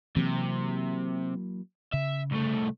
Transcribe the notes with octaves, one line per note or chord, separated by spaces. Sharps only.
C3 E3 F#3 A#3
C#3 E5
C2 A3